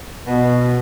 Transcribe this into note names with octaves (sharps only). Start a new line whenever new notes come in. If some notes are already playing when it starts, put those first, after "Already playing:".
B2